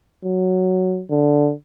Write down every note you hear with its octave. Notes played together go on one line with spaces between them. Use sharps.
F#3
D3